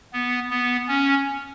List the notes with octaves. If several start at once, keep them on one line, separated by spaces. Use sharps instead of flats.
B3
B3
C#4